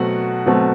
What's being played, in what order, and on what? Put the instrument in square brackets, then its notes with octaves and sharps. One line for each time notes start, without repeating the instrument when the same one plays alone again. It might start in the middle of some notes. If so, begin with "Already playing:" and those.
Already playing: [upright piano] B2 F#3 A3 C4 [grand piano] F#4 F#5
[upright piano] B2 F#3 A3 C4